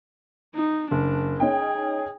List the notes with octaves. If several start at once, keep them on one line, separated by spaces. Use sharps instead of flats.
D#4
F#1 D4
C#4 D#4 G#4 G5